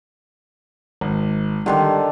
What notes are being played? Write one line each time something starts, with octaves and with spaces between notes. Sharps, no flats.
G#1
D3 D#3 G3 D4 C6